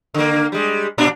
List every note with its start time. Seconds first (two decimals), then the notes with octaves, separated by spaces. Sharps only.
0.14 D3 A#3
0.52 G3 G#3
0.98 A#2 D4